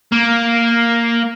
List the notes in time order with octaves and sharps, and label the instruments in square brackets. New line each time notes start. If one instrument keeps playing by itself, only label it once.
[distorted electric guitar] A#3